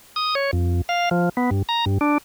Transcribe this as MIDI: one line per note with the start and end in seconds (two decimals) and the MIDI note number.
0.16 0.35 87
0.35 0.51 73
0.53 0.81 41
0.89 1.09 77
1.11 1.29 53
1.37 1.50 59
1.51 1.62 43
1.69 1.85 82
1.86 1.98 43
2.01 2.18 62